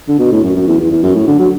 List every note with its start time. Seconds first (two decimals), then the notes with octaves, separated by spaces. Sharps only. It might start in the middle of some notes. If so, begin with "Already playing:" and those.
0.08 D3
0.19 B2
0.32 A2
0.43 F#2
0.56 F#2
0.67 E2
0.80 E2
0.91 E2
1.03 F#2
1.16 A2
1.27 D3
1.40 F#3